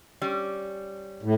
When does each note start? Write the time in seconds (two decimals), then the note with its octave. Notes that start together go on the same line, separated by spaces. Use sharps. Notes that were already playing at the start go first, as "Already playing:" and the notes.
0.22 G3 C#4
1.23 A2